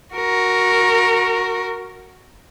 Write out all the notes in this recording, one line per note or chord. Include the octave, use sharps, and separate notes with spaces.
F#4 A#4